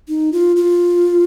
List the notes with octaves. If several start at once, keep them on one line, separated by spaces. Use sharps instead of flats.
D#4
F4
F4